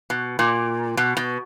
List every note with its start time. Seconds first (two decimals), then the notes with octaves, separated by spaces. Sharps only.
0.10 B2
0.39 A#2
0.97 B2
1.17 B2